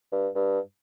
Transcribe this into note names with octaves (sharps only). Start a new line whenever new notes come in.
G2
G2